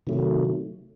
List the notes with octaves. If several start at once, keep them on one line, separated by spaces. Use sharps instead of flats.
C3 D#3 F#3 A3